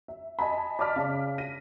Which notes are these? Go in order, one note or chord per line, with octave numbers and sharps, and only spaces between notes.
E5
D#5 G#5 A5 B5
D5 D#5 A5 D6 F6 B6
C#3
A#6 B6 D#7